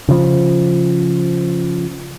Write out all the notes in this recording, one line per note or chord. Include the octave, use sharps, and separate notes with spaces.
C#3 F3